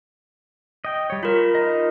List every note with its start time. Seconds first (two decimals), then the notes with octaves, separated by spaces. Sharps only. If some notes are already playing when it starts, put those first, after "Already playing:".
0.85 D#5 G5
1.10 G3 C#5
1.23 F4 A#4 A#5 B5
1.55 D#4 D#5